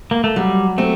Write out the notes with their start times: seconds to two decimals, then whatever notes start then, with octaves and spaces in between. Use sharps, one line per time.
0.11 A#3
0.24 A3
0.36 F#3 G3
0.78 A3 C4